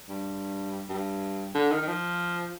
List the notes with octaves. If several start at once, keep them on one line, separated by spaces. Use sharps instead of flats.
G2
G2
D3
D#3
D#3
F3